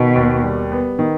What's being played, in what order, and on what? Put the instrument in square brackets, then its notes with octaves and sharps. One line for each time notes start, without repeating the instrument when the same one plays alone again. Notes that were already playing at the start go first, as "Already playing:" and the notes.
Already playing: [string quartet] B2 [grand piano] D#3
[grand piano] D#2
G3
B3
D#3